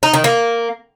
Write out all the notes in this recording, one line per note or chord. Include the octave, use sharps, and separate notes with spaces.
D#4
D#3
A#3